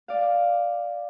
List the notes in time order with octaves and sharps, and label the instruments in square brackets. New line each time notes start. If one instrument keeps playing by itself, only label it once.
[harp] D5 F5